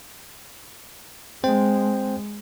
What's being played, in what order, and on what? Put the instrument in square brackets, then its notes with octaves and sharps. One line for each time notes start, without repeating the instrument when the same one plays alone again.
[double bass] G#3 [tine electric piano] C4 C5 G5